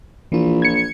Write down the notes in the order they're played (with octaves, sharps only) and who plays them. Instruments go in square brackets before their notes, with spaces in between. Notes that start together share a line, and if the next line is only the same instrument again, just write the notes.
[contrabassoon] A#1 [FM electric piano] E3 F4
[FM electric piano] G#6 C#7